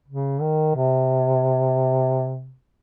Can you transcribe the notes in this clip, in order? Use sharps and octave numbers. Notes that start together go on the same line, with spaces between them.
C#3
D#3
C3